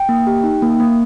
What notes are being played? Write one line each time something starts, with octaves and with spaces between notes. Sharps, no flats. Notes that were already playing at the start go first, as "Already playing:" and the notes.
Already playing: G5
A#3
G4
D#4
A#3
A#3